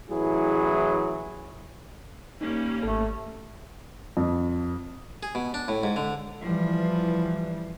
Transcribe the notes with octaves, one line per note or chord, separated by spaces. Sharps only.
A1 E3 F#3 E4 G#4
G3 A#3 C#4 D#4
G#1 A3 A4
F2
G#4
B2
D4
A2
G#2
D3
E3 F3 G3